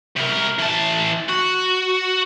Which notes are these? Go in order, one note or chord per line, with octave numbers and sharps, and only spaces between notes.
C3 A#4
E3 A5
F#4